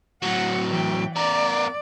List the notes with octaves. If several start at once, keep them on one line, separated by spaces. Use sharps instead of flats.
A2 F#3 F#5
E3 G5
B3 A#4 D5